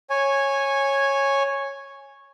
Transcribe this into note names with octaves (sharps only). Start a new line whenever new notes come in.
C#5 G#5